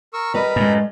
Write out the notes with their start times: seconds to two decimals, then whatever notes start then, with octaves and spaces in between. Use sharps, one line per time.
0.14 A#4 C#6 E6
0.34 G3 A#4 B4 D#5 A#5 B5
0.56 F#2 A2 G#3